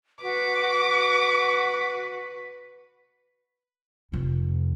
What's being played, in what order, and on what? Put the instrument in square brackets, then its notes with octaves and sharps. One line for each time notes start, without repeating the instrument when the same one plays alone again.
[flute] F#4 [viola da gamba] B4 [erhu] D6
[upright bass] F1 F2